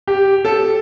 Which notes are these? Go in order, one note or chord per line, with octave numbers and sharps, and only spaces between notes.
G4
A4